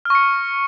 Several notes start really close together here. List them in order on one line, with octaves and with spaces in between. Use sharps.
F6 C#6 C#7